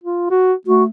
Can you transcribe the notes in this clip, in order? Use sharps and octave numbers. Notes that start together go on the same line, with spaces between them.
F4
F#4
A3 F#4